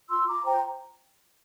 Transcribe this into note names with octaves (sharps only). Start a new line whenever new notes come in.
F4 C6 E6
F4 A#5 D6
C5 G5 A#5